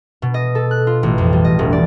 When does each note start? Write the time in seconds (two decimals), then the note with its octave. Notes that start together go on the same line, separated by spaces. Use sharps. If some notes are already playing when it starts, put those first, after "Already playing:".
0.22 B2
0.34 D#5
0.55 A4
0.71 F#6
0.87 F4
1.03 A1
1.18 F2
1.33 G3
1.44 D#5
1.59 E1
1.73 D5